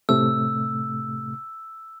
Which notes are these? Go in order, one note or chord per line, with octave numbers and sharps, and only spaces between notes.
A2 C3 A3 E6